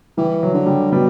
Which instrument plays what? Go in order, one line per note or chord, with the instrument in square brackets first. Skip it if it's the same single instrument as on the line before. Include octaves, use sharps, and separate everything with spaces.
[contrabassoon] E3 [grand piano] G3
[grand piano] F#3
[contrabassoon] D3
[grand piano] G3
[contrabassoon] B2 [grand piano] G3